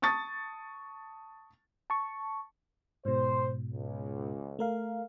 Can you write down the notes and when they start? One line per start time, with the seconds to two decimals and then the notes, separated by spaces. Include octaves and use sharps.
0.02 A5 C#6 D#6 A6
1.90 A5 C#6
3.05 G#2 B2 C5
3.71 C#2
4.59 A3 A#4 F5